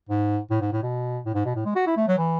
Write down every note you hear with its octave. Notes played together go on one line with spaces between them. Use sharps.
G#2
A2
G#2
A2
B2
A2
G#2
B2
A2
G#3
F#4
E4
A3
F#3
E3